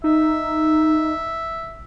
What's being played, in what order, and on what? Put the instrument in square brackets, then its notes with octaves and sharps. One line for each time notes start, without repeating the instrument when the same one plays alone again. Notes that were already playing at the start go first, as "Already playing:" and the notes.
[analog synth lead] D#4 [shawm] E5